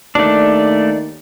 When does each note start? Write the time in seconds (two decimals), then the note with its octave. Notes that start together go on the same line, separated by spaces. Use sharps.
0.15 D#2 A3 D4 D5